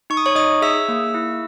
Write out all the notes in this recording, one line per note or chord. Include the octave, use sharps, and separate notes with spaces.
D#4 C#6
D#6
C#5 C#6
D#4 D#5 D#6
G#4 E5 E6
A#3
E4